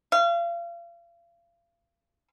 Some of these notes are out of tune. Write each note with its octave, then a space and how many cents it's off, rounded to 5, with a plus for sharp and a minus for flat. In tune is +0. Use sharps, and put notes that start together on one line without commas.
F5 -35